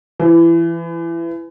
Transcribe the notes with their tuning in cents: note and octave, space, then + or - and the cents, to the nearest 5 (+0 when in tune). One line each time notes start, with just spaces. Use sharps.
E3 +25